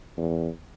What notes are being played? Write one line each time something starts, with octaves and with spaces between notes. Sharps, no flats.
E2